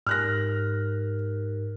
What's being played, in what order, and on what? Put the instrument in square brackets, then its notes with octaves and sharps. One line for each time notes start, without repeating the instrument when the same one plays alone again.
[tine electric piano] G#2 [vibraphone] D#4 G4 A#4 [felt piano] F6 F#6 A#6